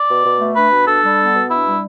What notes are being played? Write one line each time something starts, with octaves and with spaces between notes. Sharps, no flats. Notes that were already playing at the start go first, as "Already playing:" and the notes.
Already playing: D5
B2
B2
A3
D4 B4
B2
D4 A4
G3
B3
B2
D4 E4
G3